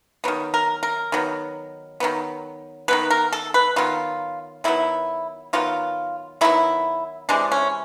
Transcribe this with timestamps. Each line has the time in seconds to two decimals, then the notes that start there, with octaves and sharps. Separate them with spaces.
0.24 D#3 F#3 B3
0.54 A#4
0.83 A#4
1.12 D#3 F#3 B3
2.00 D#3 F#3 B3
2.88 D#3 F#3 B3 B4
3.10 A#4
3.33 A4
3.54 B4
3.76 D#3 F#3 B3 F4
4.64 D#3 F#3 B3 E4
5.53 D#3 F#3 B3 F4
6.41 D#3 F#3 B3 E4
7.29 C3 E3 G#3 D4
7.52 C#4